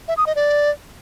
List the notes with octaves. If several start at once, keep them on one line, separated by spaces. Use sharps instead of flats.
E5
D#6
D#5
D5